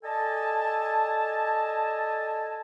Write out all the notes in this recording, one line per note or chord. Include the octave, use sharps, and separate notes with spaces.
A4 D5 D#5 G#5 A5